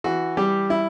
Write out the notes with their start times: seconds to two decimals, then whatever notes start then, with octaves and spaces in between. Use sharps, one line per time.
0.04 E3 F#4
0.37 G3 G4
0.70 E4